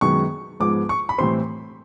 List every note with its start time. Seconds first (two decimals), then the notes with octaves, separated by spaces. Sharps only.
0.01 F#2 D#3 G#3 B3 C#6
0.60 G#2 F3 G#3 B3 D6
0.89 C#6
1.09 B5
1.18 A2 E3 G3 C4 C6